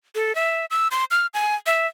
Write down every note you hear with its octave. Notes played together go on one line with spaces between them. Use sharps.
A4
E5
E6
C6
F6
G#5
E5